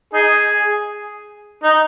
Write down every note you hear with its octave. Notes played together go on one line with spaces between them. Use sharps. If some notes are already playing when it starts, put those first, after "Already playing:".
D#4 G#4
D#4